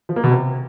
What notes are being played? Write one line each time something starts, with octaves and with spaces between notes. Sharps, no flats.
F3
A#3
B2
C3